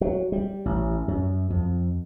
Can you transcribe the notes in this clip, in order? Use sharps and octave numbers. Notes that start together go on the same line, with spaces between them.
F#3
G3
A1
F#2
F2